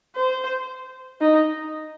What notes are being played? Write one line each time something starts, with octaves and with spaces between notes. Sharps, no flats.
C5
D#4